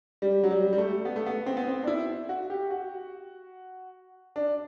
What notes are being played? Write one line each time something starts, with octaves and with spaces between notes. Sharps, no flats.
G3
F#3
G3
G3
A3
B3
A3
B3
C4
B3
C4
D4
E4
F#4
G4
F#4
D4